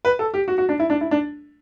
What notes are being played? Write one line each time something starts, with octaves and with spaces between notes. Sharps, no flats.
B4
A4
G4
F#4
F#4
D4
E4
D4
E4
D4